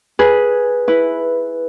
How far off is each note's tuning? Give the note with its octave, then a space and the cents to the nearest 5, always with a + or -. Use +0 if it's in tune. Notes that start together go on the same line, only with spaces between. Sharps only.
G#4 +0 B4 -10
E4 +0 B4 +0